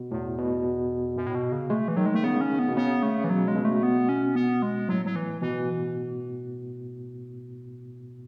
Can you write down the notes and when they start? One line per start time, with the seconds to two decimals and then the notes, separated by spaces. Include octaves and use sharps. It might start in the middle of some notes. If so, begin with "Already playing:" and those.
Already playing: B2
0.11 E2 A2
0.38 B2
1.17 F#2
1.27 A2
1.35 B2
1.52 C#3
1.70 G#3 A3
1.88 E3
1.97 D#3 F#3
2.06 G#3
2.14 A3
2.23 C#3 B3
2.41 C#4
2.59 B3
2.68 B2
2.77 C#3 B3
3.03 A3
3.24 E3
3.30 B2 F#3
3.48 G#3
3.56 B2
3.65 A3
3.83 B3
4.09 C#4
4.35 B3
4.62 G#3
4.89 A2 F#3
5.06 F#3
5.16 E3
5.42 B2 E3